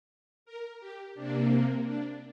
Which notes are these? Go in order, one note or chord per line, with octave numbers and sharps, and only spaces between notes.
A#4
G4
C3 A#3 D4
D4